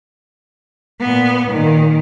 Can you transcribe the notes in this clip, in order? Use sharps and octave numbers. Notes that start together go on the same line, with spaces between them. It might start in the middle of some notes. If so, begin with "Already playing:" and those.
A#2 B3
A#2 D#3